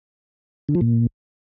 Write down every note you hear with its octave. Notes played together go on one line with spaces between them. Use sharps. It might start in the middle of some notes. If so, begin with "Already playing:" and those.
D3
F3
A#2